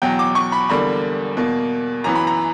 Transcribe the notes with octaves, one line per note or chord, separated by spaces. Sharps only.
E2 B2 F#3 G5
D6
C#6
B5
E2 D3 G3 A#3 B5
E2 B2 A#3
F#2 E3 B3 A#5
B5
A#5